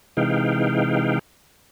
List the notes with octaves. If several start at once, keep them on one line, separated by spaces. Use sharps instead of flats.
C3 E3 G#3 D#4 F5 G5